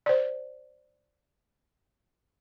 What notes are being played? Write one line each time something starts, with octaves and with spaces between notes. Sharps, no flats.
C5 D5